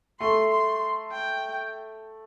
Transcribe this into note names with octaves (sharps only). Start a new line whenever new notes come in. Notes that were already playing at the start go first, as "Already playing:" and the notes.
A3 C6
C6
G5